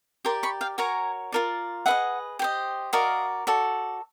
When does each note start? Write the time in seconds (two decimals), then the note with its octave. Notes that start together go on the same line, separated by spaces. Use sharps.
0.25 G4 A#4 D5 C6 D6
0.43 B5 C#6
0.61 F5 G5
0.78 F#4 A#4 C#5 G#5 A#5
1.32 F4 A#4 D5
1.86 G#4 B4 D#5 E5 F#5
2.39 G4 C5 D#5
2.93 F#4 A#4 D5 D#5 F5
3.47 F#4 A4 D5